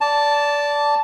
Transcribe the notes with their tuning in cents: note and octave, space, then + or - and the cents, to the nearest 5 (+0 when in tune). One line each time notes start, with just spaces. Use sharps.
D5 -20 A5 +0